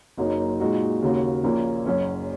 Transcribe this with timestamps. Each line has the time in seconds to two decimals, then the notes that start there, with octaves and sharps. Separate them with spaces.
0.17 F#1 F#2 F#3 A#3 D#4
0.60 A#2 G#3 D#4 F#4
1.02 D#2 C#3 A#3 F#4
1.43 A#1 A#2 A#3 C#4
1.86 F#1 F#2 F#3 C#4